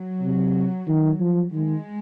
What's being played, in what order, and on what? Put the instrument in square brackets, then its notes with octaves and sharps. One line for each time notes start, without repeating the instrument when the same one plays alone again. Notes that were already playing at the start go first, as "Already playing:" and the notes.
Already playing: [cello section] F#3
[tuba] C3
D#3
F3
[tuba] D#3 [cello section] G#3